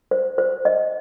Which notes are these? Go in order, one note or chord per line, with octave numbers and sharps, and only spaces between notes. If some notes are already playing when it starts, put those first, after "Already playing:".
C5
C5
D#5